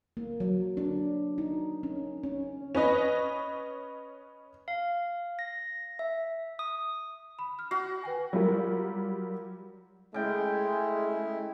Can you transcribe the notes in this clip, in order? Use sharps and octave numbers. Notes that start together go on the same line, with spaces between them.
A#3
F#3
D4
D#4
C#4
C#4
C#4 B4 D#5
F5
A#6
E5
D#6
B5
F6
F#4 C7
B4 G5 G#5
F#3 G3 F4 A#4
C#3 G#3 A3 E4 G5